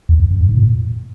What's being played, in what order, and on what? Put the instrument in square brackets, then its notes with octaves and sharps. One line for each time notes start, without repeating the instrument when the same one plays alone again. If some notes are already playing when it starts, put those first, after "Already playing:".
[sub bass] E2
F2
F#2
F#2
G#2
A#2